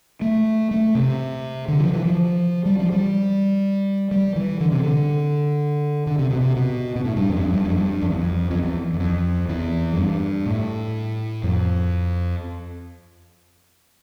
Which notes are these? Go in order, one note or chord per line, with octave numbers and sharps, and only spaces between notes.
A3
A3
C3
D3
F3
E3
F3
G3
F3
G3
G3
E3
D3
C3
D3
D3
C3
B2
C3
B2
B2
A2
G2
F2
G2
F2
G2
F2
G2
F2
E2
F2
F2
E2
E2
F2
E2
F2
G2
A2
F2